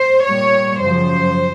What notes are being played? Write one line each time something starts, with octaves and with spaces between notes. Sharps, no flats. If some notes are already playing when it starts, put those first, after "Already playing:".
Already playing: C5
A#2 G3 C#5
F#2 C#3 F3 C5